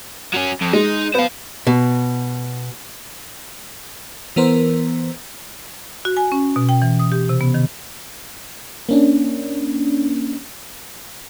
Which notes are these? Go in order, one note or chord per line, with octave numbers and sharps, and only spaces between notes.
F#3 C#4
F2
G#3 D#4
B3 C5 F5
B2
E3 B3 A#4 C5
F#4
G#5
C#4
B2
G5
E3
D#6
G4
C3
B3
D#3
A#3 C#4 D4